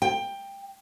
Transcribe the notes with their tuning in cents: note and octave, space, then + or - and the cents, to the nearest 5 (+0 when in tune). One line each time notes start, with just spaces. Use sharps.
G5 +15